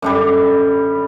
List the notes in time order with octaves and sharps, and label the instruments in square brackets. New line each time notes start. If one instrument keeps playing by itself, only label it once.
[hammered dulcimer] F#2 D3 G3